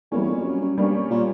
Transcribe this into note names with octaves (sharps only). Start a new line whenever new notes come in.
E2 G3 A#3 C#4
F2
F#2
F#2
G2 G3 A#3 C#4
A#2